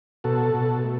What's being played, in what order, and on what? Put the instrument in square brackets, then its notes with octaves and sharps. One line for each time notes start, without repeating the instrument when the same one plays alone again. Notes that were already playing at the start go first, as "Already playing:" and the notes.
[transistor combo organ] B2 F#4 A4
B2
A3